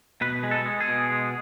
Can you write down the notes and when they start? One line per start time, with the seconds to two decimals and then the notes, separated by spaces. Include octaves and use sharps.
0.21 B2 B4
0.43 G#3
0.51 A4
0.66 G#3
0.81 G#4
0.88 B2
1.11 G#3